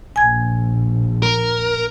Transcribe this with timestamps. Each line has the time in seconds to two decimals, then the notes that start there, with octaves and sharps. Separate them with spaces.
0.16 A#1 G#5 G#6
1.22 A#4